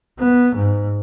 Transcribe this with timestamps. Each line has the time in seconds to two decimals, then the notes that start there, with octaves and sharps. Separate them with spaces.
0.19 B3
0.56 G#2